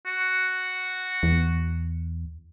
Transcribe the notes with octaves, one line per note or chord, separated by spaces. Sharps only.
F#4
E2